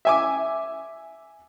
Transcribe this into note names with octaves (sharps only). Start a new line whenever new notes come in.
E5 G#5 D6